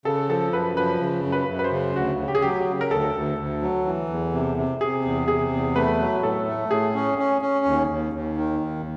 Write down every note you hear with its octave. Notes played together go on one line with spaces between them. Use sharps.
C#3 A4
F3 A4
F#2 B4
F3 B4
C#3
F#2
B4
F#2
B4
C5
C#3
D2 F#4
C#3
G4
G#4
F#3 G4
G4
C#3
A#4
D2 A4
D2
D2
F#3
E3
E2
C3
C3
C3 G#4
E2
C3 G#4
E2
A3 B4
F#3
A2 A4
A3
A2 G#4
C#4
C#4
C#4
D#2
D#2
D#2
D#3
D#2